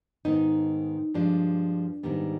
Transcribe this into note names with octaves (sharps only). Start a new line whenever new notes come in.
G#2 D#3 B3 D#4
G2 F3 G#3 D4
G#2 D#3 G3 B3